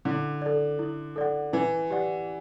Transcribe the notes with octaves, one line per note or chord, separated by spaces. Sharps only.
D3 E4
A4 D5
E4
A4 D5 F#5
E3 E4
G4 D5 F#5